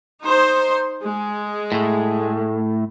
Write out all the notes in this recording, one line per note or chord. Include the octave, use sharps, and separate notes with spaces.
D#4 C5
G#3
A2 A3